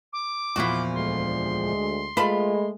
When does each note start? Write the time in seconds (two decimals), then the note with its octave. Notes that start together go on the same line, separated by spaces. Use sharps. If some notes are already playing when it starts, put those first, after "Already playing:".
0.13 D6
0.56 E2 A#2 F3 E4 F#4
0.94 D2 G#3 C6
2.17 G#3 A3 F4 B4 A5 B5